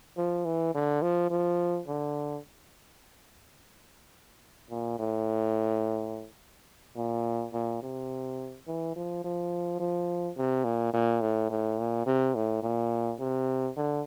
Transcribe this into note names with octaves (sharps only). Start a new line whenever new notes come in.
F3
E3
D3
F3
F3
D3
A#2
A2
A#2
A#2
C3
E3
F3
F3
F3
C3
A#2
A#2
A2
A2
A#2
C3
A2
A#2
C3
D3